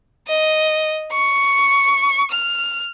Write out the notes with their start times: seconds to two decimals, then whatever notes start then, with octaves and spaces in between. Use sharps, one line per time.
0.27 D#5
1.12 C#6
2.31 F6